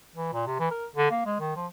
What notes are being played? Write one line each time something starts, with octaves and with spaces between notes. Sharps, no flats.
E3
A#2
C3
E3
A#4
D3
A#3
G#3
D#3
F3